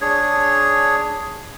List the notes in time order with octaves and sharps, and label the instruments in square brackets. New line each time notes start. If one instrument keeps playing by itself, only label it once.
[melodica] D4 G#4 C#5